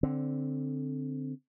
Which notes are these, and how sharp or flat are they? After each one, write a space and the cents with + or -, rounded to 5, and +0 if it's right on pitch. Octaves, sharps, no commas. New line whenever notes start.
D3 +0 C4 +0